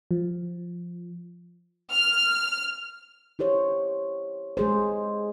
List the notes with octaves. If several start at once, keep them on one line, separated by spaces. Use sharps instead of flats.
F3
F6
E4 G4 C5 C#5
G#3 G#4 C5